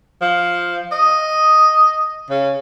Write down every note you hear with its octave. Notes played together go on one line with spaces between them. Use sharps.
F3
D#5
C#3